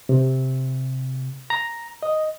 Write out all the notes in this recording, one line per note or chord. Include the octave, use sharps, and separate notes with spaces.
C3
A#5
D#5